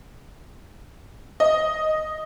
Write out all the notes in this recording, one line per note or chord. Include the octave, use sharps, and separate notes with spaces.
D#5